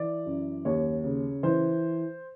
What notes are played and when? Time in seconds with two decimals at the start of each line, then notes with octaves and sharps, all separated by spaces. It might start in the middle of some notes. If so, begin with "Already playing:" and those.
Already playing: E3 D5
0.26 F#2
0.65 D#2 C#5
1.04 C#3
1.43 E3 C5